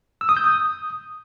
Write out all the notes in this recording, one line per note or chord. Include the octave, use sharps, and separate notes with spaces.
E6
D#6
G6
D#6